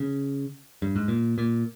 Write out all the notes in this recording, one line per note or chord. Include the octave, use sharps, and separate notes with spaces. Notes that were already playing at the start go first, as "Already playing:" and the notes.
Already playing: C#3
G2
G#2
A#2
A#2